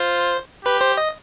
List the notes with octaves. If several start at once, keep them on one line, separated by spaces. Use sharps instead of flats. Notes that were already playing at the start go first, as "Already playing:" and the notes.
Already playing: F4 C5
G4 B4
C5
D#5